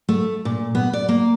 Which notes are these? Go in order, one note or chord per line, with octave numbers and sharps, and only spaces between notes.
A3
A#2
B3
D5
A#3